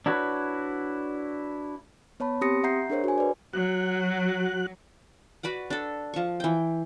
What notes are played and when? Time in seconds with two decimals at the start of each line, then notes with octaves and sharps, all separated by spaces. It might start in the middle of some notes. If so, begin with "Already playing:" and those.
0.06 D4 E4 F#4 B4 C#5
2.20 B3 C#5 A5 B5
2.41 C4 G4 C6 D#6 A#6 C#7
2.63 E5 F#5 A#5 G6 C7
2.90 D4 G#4 A#4 C5 C#5
3.04 F#4 G#5
3.18 B4 D5
3.53 F#3 F#4 F#6
5.43 F#4 B4 D5 F#5
5.70 D4 A4
6.14 F3 C#6
6.40 E3 G5